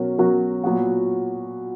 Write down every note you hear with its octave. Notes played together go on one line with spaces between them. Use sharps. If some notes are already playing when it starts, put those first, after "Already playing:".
Already playing: B2 F#3 C#4 F#4 A#4
B2 F#3 C#4 F#4 A#4
A#2 F#3 B3 F#4